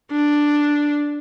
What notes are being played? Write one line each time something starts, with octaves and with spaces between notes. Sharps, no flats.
D4